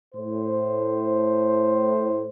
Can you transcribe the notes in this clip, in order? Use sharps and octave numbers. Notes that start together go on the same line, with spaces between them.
A2 C5